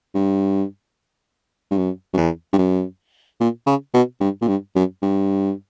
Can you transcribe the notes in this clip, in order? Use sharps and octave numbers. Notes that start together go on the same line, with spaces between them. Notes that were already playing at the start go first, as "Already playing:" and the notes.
G2
G2
F#2
F#2
E2
G2
F#2
A#2
C#3
B2
G2
A#2
G2
F#2
G2